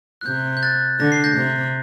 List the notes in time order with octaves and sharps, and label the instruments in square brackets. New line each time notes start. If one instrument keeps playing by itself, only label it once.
[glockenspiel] F#6
[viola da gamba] C3 [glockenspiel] G6
[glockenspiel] G6
F#6 A6
[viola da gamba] D3 [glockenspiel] A#6
[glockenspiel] C7
G6 A#6
[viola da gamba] C3